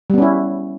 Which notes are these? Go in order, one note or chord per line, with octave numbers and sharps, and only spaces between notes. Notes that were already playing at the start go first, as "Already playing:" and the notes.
G3 B3 C#4 E4